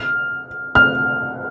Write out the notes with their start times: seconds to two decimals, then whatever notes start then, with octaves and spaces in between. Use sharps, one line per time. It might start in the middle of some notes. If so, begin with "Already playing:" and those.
Already playing: F6
0.75 F6